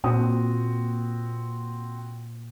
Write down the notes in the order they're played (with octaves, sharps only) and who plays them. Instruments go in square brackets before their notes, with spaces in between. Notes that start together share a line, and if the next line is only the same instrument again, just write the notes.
[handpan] A#2 [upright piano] C4 F#4 D#6